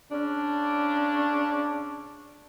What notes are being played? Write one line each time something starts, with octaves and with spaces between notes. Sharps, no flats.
C#3 C#4 D4